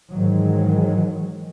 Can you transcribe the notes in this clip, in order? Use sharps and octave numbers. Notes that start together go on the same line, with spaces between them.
G#2 D#3 E3 F#3 G#3